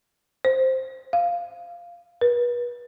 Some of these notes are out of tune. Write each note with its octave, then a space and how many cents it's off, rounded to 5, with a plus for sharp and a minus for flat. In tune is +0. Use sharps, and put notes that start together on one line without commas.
C5 +5
F5 -5
B4 -35